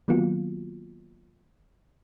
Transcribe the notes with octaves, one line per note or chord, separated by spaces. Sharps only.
D#3 F#3 A#3 B3 F4 F#4